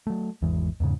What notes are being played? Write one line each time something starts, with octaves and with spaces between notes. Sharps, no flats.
F#3 A3
G#1 E2 E3 G#3
E2 G#2 C#3